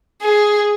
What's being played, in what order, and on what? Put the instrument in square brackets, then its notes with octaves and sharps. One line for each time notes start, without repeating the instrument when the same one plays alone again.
[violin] G#4